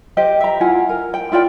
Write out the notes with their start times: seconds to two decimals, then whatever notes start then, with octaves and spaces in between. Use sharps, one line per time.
0.17 G4 C5 D#5 G5
0.41 E5 A#5
0.61 E4 F4 F#5 G#5
0.89 A#4
1.14 G5
1.32 E4 F4 D5 G5